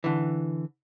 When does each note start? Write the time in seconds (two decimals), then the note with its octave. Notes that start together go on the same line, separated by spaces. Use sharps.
0.04 D3 E3